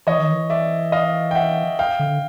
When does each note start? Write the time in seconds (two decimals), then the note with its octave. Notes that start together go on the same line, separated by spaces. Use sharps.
0.07 E3 C#5 D#5
0.19 D#3
0.31 E3
0.50 D5 E5
0.92 D#5 F5
1.31 G5
1.35 E5 F#5
1.79 F5 G5
1.99 D3